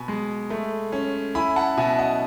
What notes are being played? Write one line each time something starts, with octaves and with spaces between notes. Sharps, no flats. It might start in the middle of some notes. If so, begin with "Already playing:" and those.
Already playing: B2 G#5 B5
G#3
A3
C#4
E4 G#5 B5
F#5 A5
B2 E5 G#5
D#5 F#5